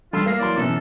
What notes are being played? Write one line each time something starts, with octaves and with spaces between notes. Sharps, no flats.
G3 F4 A4 C6 E6
A#3 F5 F6 A#6 C7
E3 F#3 D5 C6
F#2 B2 E3 A4